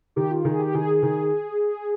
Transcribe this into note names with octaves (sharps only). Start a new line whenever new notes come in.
D#3 G4
F4
D#3 G#4
G4
D#3 G#4
D#3